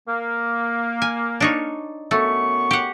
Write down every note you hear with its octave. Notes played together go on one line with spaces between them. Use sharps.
A#3
G#5
D4 D#4 C#5
F#2 A3 B3 C#6
G4 F#5